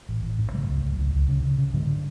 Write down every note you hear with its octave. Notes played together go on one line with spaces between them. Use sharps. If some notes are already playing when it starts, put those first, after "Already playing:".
A1
A1
G#2
C#3 F#3 A3
C#2
C#2
C#2
C#2
C#3
C#3
C#3
G#2 D3 F#3